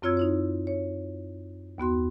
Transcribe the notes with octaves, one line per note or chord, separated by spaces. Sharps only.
F#2 C4 F4 C#5 E6 G#6
D#4 E4 C#5
C#5
D#2 B3 F#4 C6